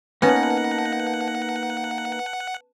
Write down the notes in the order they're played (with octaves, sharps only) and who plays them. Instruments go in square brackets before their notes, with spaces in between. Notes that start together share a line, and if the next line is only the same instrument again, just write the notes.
[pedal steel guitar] A#3 D#4 [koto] B3 C#4 [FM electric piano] B4 A5 [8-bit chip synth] F#5